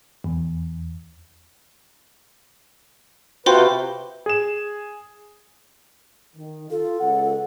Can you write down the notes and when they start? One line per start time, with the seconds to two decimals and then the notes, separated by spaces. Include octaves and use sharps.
0.24 E2
3.46 C3 F4 F#4 B4 C5 G5 C6
4.26 G#4 E7
6.36 D#3
6.70 F4 A4
7.00 C#2 F#5